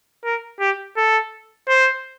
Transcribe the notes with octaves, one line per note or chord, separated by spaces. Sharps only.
A#4
G4
A4
C5